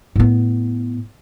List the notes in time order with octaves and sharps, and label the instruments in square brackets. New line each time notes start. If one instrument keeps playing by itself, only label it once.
[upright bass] A2 B3